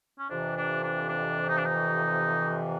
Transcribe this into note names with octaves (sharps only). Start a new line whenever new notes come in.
C#4
F2 C3 E3 D4
D4
D4
D4
D#4
D4
D#4